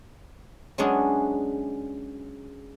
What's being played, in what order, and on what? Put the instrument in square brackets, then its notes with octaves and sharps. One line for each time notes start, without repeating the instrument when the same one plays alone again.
[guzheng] F#3 G#3 B3 C#4 D4 G#4